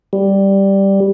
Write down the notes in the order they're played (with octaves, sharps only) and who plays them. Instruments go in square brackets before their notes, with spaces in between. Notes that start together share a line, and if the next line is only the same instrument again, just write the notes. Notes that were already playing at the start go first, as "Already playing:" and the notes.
[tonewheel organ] G3